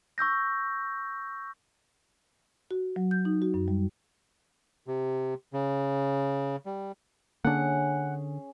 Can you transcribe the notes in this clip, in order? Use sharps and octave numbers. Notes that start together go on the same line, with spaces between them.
C#6 E6 G6 A#6
F#4
F#3
G6
D#4
F#4
F#2
G3
C3
C#3
G3
D3 A#3 C#4 D4 G#4 F#5